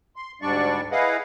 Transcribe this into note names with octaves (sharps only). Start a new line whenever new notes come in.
C6
D2 G#2 G3 D4 D5 C#6
E4 G#4 B4 D#5 F5 F#5